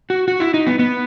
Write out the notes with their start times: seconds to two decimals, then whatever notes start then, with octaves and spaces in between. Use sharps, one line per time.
0.10 F#4
0.28 F#4
0.40 E4
0.54 D#4
0.67 B3
0.79 B3